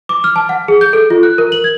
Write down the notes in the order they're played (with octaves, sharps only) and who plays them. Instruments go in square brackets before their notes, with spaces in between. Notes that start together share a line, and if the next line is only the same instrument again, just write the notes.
[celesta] D6
F6
A5
F#5
G#4
G6
A4
F4
F#6
A#4
F#7
G#6